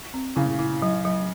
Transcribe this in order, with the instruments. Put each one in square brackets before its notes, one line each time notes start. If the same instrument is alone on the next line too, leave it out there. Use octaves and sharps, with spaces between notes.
[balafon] C4
[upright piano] C#3 [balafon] E4
[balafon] E4
F#3
F#3